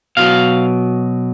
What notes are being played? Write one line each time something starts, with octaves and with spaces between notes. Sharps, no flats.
B2 F#3 F5